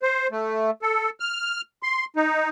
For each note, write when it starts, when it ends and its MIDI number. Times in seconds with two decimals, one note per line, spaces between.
0.02 0.27 72
0.31 0.71 57
0.82 1.10 69
1.20 1.61 89
1.83 2.05 84
2.16 2.49 63